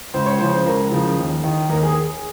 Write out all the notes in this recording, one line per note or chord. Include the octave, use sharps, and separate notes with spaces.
C#2 C5
C#5
C#3 F3 C5
C#2 A#4
C#3 F3
D#2
D#3
D#2 A#4
G#4